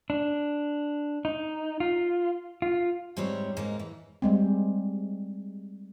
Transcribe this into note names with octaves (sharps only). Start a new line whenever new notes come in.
D4
D#4
F4
F4
G#2 G3 C4 G4 C#5
G#2 A#3 D#4
E3
G3 G#3 C4